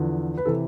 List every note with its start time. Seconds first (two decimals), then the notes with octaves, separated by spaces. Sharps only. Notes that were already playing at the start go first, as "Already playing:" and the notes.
Already playing: E2 D3 F3
0.38 B4
0.45 C3 E3 A4